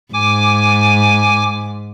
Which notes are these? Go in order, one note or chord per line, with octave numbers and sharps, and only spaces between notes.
G#2 G#5 D6